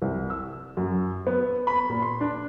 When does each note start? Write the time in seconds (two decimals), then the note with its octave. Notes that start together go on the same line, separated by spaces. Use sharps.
0.02 C2
0.30 E6
0.77 F#2
1.27 B3
1.67 B5
1.90 A#2
2.02 C6
2.21 D4